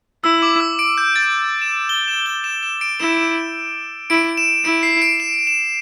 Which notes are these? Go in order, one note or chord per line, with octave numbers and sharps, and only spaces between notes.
E4 E6
D6
E6
D7
G6
A6
E7
G7
E7
G7
E7
E7
D7
E4 E7
E4 D7
E7
E4 D7
C7
D7
E7
E7